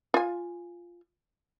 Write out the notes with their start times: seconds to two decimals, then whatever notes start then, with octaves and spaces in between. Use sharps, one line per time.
0.14 F4 G#5